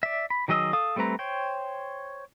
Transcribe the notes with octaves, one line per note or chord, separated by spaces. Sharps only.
D5 E5
B5
D#3 F#3 G#4 D#5 E6
A4 F5 D#6
G3 A3 C4 B4 A#5
C5 C#5 G5